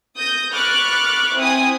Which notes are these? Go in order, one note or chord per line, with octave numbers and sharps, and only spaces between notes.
D#6 G6 A#6
B5 C#6 D6 F6 F#6 A6
C4 E4 G5 G#5 D#6